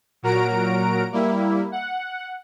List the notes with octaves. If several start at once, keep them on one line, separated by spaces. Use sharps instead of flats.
A#2 F#3 F#4 A#4 A#5 D7
G3 A#3 E4
F#5